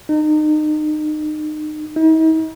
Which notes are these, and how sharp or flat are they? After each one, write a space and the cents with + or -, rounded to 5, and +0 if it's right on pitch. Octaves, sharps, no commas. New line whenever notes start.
D#4 -30
D#4 +45